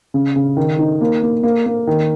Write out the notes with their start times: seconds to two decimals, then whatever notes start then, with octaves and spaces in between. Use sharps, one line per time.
0.14 C#3
0.36 C#3
0.57 D#3
0.79 D#4
1.01 A#3
1.22 A#3
1.43 A#3
1.66 A#3
1.87 D#3